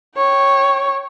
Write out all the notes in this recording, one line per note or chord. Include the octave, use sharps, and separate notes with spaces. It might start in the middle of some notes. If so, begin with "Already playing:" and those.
C#5 G5